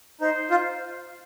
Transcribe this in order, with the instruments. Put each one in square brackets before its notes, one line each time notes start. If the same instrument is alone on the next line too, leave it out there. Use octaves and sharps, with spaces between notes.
[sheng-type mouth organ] D#4 [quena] C5
[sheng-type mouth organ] F4